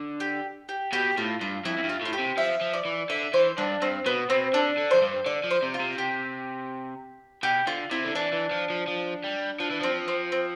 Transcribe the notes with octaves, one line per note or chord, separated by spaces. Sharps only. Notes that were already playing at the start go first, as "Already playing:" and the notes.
Already playing: D3
G4
G4
B2 G4
A2 F4
G2 F4
F2 E4
F2
G2
F4
A2 F4
G4
C3
F3 E5
F3
D5
E3
D3 E5
E3 C5
G2 D4
G2 C4
B2 B3
B2 C4
D3 D4
D3
F2 C5
G2
D3 D5
F3
C5
C3
F4
C3
G4
B2 G4
D3 F4
C3 E4
D3
E3 D4
E3
F3
F3
F3
G3
F3 D4
E3
F3 C4
C4
C4